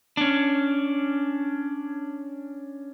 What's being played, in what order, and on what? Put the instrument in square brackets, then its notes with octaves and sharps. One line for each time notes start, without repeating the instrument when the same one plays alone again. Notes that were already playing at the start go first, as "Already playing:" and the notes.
[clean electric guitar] C#4 D4